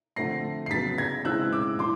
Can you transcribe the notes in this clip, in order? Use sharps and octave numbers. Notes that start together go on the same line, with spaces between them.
D3 F3 A3 C4 A#6 C7
C7
C#3 F#3 B3 A6 B6
G#6 A#6
C#3 E3 G#3 C4 E6 F#6
D6 E6
E3 C6 D6